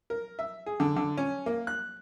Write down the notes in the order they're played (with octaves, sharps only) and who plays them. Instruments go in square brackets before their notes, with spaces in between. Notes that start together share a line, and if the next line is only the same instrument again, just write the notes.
[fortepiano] A#4
E5
G#4
D3
D3
C#4
A#3
F#6